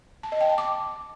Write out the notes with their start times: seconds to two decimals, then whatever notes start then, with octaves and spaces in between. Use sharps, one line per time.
0.23 A5
0.32 D#5
0.41 G5
0.49 A5
0.58 D6